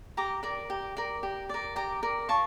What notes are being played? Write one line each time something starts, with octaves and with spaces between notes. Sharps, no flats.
G4 A#5 D6
A#4 D5
G4
A#4 D5
G4
A#4 D5
G4 A#5 D6
A#4 D5
F4 A5 C#6